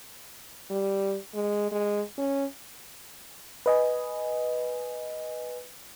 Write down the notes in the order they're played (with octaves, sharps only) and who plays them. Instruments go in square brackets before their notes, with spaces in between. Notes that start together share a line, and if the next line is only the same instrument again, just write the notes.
[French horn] G3
G#3
G#3
C#4
[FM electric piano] B4 D#5 G#5